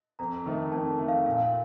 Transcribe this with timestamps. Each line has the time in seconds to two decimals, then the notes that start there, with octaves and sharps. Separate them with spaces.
0.19 F2 A#5
0.46 D#3 A3
0.72 F2 A5
0.99 D#3 A3
1.08 F5
1.26 A#2 F5